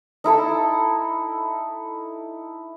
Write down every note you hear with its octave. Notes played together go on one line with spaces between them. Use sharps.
D#4 E4 A4 E6